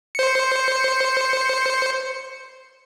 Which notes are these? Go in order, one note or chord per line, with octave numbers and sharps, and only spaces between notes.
C5 C#7